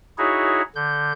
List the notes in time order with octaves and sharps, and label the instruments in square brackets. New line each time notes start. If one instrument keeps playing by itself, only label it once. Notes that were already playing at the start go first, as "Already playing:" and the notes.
[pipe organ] D#4 E4 F#4 G#4 C#5
D3 G6